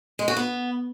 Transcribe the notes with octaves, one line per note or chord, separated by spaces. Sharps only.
G#3
F#4
B3